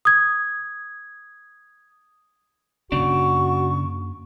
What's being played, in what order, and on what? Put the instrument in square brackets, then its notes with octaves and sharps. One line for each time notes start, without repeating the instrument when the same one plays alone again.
[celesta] D#6 G#6
[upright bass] F#2 A#3 [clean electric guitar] C#3 D4 [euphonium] F#4 [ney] C#6